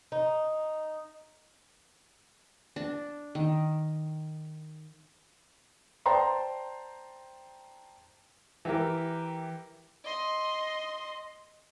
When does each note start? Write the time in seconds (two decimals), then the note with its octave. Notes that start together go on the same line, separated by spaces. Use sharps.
0.12 D#4
2.76 D4
3.35 D#3
6.06 C5 D5 G5 A5 A#5 C6
8.65 E3 G4 A#4
10.04 D#5 C6